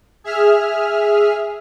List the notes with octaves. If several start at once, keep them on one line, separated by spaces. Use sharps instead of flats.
G#4 E5 F6